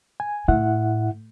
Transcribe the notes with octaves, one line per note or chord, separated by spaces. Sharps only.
G#5
A2 E4 E5 F#5